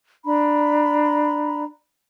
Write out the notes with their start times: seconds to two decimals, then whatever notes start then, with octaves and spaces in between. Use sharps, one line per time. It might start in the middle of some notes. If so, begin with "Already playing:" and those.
0.25 D4 A#5 B5